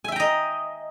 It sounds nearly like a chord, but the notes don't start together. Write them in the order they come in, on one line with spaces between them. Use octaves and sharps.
G#5 E5 G5 A#5 D#5